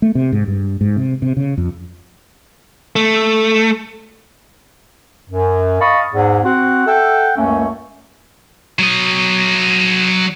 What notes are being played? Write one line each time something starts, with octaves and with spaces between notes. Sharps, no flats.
A3
C3
G#2
G2
G#2
C3
C3
C#3
F2
A3
F#2
D#5 F5 A5 B5 C#6 D#6
E2 G#2
C4 F#4 F#5
A4 E5 F#5 G5
C#2 F#2 A3 A#3 C#4
F#3 D#5